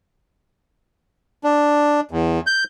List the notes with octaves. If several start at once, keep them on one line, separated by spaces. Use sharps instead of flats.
D4
E2
G6